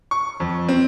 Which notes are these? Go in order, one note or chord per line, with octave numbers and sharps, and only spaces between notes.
C#6
F2
C4